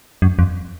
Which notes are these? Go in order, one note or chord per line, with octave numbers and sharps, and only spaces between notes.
F#2
F2